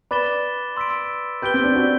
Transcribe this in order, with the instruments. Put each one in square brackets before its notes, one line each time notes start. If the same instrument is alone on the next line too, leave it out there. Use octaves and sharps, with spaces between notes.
[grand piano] B4 D5 [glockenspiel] B5 D6 A6 E7 G7
[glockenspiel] C6 E6 B6 D7
[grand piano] G4 B4 [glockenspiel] G6 D7 G7
[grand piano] C4
D4
D4 F#4